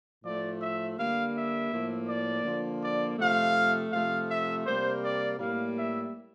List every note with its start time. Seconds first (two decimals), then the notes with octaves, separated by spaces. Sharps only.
0.24 A2 F3 A3 D5
0.61 E5
0.98 D3 G3 A#3 F5
1.35 E5
1.72 A2 F3 A#3
2.08 D5
2.45 D3 F3 A#3
2.82 D5
3.18 C3 F3 A3 F5
3.92 C3 F3 A3 F5
4.28 E5
4.65 C3 G3 A#3 C5
5.03 D5
5.38 A2 G3 A#3 F5
5.76 E5